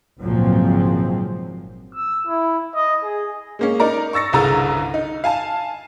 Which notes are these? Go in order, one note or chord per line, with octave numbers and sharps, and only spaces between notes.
G#1 C#2 A#2 F3 F#3 C4
E6
E4
D#5
G#4
G#3 A#3 C#4
D#4 A#4 D5 A#5
C#6 E6 A6 A#6 C#7
G1 C2 C#3 A#5 E6 A6
D#4
F5 G#5 A5